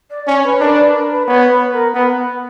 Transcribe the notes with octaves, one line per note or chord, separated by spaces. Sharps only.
D5
C#4 C#5
B4
D4 A#4
B4
A#4
B4
B3 C#5
B4
A#4
B3 B4